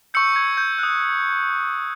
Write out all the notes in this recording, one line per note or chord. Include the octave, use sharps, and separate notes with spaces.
C#6 E6 G6 C#7
G#6
G6
D#6 F#6